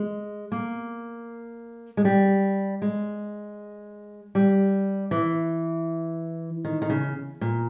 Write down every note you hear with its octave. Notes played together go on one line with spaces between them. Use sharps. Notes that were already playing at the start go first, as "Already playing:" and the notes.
Already playing: G#3
A#3
G#3
G3
G#3
G3
E3
D#3
D#3
C#3
A#2